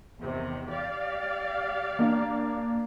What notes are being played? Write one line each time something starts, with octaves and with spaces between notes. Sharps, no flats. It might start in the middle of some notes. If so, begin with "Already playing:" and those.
E2 C3 D#3
G4 D5 F5
A#3 D4